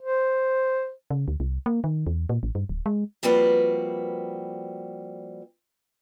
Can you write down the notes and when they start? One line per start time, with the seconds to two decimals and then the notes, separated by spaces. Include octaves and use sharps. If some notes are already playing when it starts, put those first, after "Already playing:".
0.02 C5
1.11 C#3
1.28 D2
1.40 C2
1.66 A#3
1.84 D#3
2.07 E2
2.29 A#2
2.43 A1
2.55 G2
2.69 D1
2.86 G#3
3.23 F3 G3 A#3 C4 F#4 B4